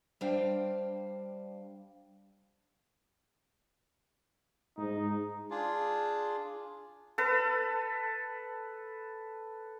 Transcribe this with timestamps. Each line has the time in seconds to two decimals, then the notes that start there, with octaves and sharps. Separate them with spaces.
0.21 G3 D4 C5 F5 G5
4.78 G#2 D#4
5.51 D4 F4 G#4
7.18 A4 B4